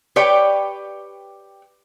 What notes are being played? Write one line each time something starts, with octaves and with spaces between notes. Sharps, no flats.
G4 B4 C#5 D5 G5